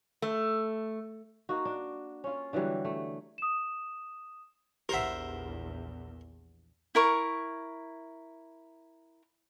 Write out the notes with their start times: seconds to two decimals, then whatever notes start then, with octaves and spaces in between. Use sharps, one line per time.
0.22 A3
1.49 A#3 D#4 F#4
1.65 D4
2.24 C#4 F4
2.53 D3 E3 F#3 G3
2.85 A3
3.38 D#6 E7
4.89 A#1 E2 G4 A#4 C5 E5 F#5
6.95 E4 A#4 C#6